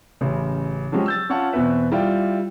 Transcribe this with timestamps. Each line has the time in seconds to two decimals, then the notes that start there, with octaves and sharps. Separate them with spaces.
0.21 A1 C#3
0.92 F3 F#3 G#3 C#4 G4
1.06 E6 G6 A6
1.29 C#4 F4 C#5 F#5 A5
1.53 E2 B2 C4 B4 E5
1.92 G3 E4 F4 G5